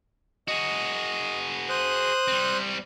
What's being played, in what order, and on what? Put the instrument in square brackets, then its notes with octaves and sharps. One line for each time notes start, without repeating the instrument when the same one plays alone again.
[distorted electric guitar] F#4 G#4 [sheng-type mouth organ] D#5
[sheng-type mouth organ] C5 D#6 F#6
[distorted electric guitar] G3 C4